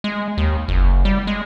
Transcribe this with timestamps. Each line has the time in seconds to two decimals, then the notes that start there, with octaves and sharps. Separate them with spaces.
0.04 G#3
0.38 D#2
0.68 F#1
1.05 G3
1.27 G#3